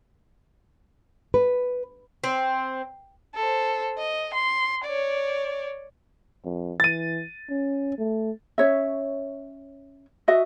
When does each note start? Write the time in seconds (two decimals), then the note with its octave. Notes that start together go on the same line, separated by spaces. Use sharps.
1.34 B4
2.24 C4
3.35 A4 C5
3.98 D#5
4.34 C6
4.84 C#5 D5
6.45 F2
6.80 E3 A6 D#7
7.50 C#4
7.98 A3
8.58 C#4 C#5 E5
10.28 F#4 D#5 E5